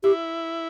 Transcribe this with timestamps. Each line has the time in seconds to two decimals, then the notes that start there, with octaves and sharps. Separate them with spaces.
0.04 E4 G4